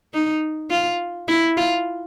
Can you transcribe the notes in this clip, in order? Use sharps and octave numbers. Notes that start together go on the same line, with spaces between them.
D#4
F4
E4
F4